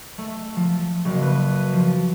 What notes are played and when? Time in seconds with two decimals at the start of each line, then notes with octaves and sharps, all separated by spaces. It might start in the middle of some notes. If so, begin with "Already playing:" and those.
0.18 A3
0.56 F3
1.05 F#1
1.22 B4
1.56 D#7
1.73 F3